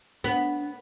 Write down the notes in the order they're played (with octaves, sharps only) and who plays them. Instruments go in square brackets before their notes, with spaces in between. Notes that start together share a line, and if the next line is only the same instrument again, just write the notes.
[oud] B3 [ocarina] D4